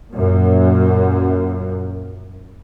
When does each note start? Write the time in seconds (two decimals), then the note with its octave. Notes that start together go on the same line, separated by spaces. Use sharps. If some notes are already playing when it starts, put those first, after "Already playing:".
0.11 F#2 A#2